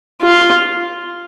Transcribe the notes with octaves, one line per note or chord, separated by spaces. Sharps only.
F4